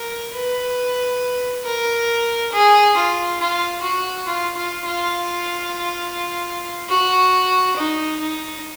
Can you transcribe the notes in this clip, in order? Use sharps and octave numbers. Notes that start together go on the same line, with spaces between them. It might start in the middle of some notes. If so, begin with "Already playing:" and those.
Already playing: A#4
B4
A#4
G#4
F4
F4
F#4
F4
F4
F4
F#4
D#4
D#4